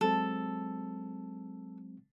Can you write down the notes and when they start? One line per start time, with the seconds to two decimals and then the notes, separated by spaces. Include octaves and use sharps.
0.01 F#3 G#3 C4 A4